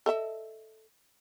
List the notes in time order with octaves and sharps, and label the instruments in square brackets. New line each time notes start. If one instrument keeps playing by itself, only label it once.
[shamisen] A4 D#5 E5